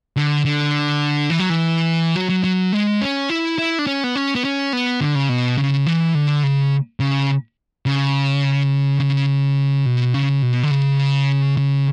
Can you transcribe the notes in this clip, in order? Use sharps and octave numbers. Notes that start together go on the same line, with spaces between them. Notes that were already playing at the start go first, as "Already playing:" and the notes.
D3
D3
E3
F#3
E3
F#3
F#3
F#3
G#3
C#4
E4
E4
D4
C#4
B3
C#4
B3
C#4
B3
D3
C#3
B2
C#3
E3
D3
C#3
C#3
C#3
C#3
B2
C#3
B2
D3
C#3
C#3